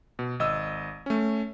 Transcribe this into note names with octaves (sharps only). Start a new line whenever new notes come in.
B2
G#1 D#5 E6
A3 C#4